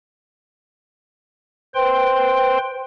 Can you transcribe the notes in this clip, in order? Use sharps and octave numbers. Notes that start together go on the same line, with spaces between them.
B4 C5 G5 C6